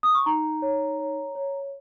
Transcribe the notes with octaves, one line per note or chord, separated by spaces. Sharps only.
D#6
C#6
D#4 A#5
C#5
C#5
C#5